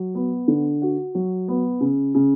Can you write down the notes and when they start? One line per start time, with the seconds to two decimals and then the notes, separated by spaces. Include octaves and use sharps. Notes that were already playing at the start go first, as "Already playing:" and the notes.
Already playing: F#3
0.15 B3
0.48 D3
0.82 F#4
1.15 F#3
1.48 B3
1.81 C#3
2.15 C#3